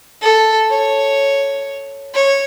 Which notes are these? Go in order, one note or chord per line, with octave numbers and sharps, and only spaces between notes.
A4
C#5
C#5